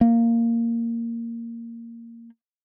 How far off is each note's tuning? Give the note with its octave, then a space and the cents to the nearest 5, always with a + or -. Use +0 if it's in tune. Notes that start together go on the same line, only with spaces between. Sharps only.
A#3 -10